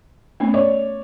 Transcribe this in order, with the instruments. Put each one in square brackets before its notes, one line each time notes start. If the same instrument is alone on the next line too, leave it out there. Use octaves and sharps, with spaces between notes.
[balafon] A3 B3 C#4
[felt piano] C#5 D5